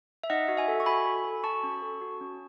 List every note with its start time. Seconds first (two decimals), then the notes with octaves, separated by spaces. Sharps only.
0.24 E5
0.30 D#4 D#5 F#5
0.48 F#4
0.57 E5 G#5
0.68 A4
0.80 C#6
0.86 F#4 G#5 B5
1.06 A4
1.24 A4
1.44 F#4 A5 C#6
1.63 C#4
1.82 A4
2.01 F#4
2.21 C#4